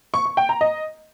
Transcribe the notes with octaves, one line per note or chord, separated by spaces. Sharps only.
C#6
C#6
G5
A#5
D#5